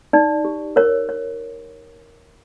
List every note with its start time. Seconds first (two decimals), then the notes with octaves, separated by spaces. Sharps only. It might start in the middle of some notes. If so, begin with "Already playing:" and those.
0.13 D#4 D5
0.45 G4
0.76 A#4 C#5
1.09 C#5